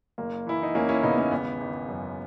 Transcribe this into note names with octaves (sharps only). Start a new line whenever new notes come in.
F#1 A#3
E3 E4
D#4
E2 A#3 C#4
C#4 E4
C#3 B3 D#4
A#3 C#4
G#1 B3
G#1
F#2